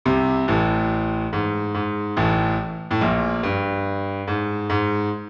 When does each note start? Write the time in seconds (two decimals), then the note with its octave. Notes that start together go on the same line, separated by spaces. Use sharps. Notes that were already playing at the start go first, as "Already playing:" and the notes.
0.05 C2 C3
0.48 A1 A2
1.33 G#2
1.74 G#2
2.17 A1 A2
2.91 A2
3.01 A#1 A#2
3.43 G2
4.27 G#2
4.70 G#2